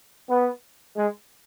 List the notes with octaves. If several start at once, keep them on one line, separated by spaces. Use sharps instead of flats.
B3
G#3